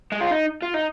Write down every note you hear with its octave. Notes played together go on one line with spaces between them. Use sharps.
G#3
F4
D#4
F4
D#4